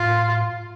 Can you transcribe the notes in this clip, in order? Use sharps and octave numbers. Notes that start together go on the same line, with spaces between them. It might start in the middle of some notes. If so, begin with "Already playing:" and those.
Already playing: A2 F4